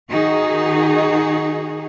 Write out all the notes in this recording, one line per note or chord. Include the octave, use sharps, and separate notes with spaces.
D#3 D#4 F#4 G#4